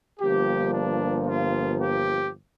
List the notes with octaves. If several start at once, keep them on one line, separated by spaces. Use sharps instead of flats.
G1 G2 F3 A#3 G4
D4
F4
G4